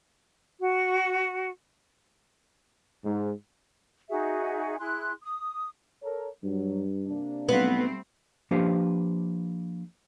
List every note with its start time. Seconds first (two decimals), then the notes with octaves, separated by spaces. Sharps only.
0.60 F#4
3.04 G#2
4.09 D#4 F#4 G#4 E5
4.80 E4 G#4 C6 F#6
5.22 D#6
6.03 A4 A#4 C#5
6.43 G2 F#3
7.07 C3 A#3 D4
7.49 B1 G3 A3 B3 C4
8.51 F3 A#3 D4 G4 B4 C5